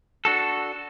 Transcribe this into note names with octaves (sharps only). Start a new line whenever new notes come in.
D4 F#4 A4